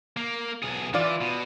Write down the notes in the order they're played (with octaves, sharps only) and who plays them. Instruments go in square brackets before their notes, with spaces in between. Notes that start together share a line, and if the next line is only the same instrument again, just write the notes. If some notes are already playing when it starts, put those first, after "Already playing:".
[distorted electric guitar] A#3
B1 G#4
[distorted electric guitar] E3 [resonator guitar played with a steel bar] F4 D5
[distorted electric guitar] B2